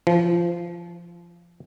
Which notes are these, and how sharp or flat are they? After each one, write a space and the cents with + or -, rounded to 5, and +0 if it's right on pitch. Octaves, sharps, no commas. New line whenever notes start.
F3 -20